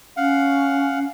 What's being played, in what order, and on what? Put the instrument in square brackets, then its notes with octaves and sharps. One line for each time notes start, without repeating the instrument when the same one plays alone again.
[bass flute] C#4 [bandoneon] F5 F#5